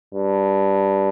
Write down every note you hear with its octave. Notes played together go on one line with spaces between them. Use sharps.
G2